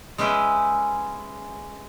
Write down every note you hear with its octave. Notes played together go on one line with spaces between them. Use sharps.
G#3 C#4 B4 E5 G5